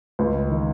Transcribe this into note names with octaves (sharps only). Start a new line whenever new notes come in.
C#2
D#3